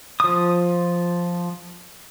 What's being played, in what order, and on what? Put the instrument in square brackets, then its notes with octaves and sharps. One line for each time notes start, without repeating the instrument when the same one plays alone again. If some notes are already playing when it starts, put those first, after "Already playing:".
[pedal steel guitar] F3 D#6